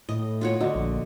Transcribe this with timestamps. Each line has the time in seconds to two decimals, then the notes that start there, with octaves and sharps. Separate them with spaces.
0.09 A2 D#5
0.41 F4 F#4 C#5
0.60 D3 F#4 D#5
0.75 A#1